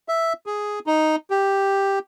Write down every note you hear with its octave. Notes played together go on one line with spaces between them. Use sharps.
E5
G#4
D#4
G4